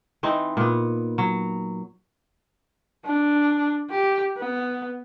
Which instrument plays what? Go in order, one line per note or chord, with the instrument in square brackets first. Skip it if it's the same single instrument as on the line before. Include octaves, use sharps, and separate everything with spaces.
[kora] E3 C4 D#4
A#2 B3
F#3
[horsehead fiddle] D4
G4
B3